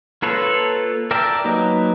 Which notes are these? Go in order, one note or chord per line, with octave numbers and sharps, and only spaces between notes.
A#3 F4 A4 B4 C#5
A#4 D5 E5 G5 A5
F#3 A#3 D#4 G4 B4